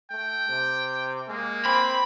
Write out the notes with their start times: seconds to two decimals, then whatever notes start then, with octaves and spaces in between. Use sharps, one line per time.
0.11 A3 G5
0.49 C3
1.28 G#3 A#3
1.65 C4 B5